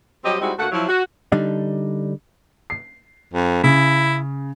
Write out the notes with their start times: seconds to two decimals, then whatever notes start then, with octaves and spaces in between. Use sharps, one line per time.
0.24 F#3 G3 C4 G4 D#5
0.41 G3 G#3 C4 D#4 E4 F#4
0.59 D2 A3 A#3 F#4 F#5
0.72 F3 F#3 E4
0.89 F#4
1.32 D3 G3 D4 D#4
2.70 C7
3.34 F2
3.64 C#3 E4